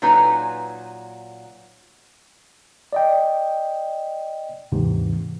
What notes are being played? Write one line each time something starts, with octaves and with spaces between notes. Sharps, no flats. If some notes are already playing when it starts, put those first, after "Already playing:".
A#2 F#3 D#4 B4 G#5 A#5
D5 D#5 G5
D#2 G#2 C3 E3